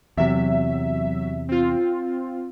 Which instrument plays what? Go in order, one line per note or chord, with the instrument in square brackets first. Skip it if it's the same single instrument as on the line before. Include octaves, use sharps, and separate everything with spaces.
[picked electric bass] E2 C3 [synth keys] F#3 E5
[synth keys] C4 F4